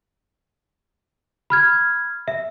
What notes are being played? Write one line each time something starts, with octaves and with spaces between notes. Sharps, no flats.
B5 F6 G#6
E5